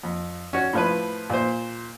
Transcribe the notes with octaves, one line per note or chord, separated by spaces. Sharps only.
F2
C#4 F#4
A2 F3 B4
A#2 C5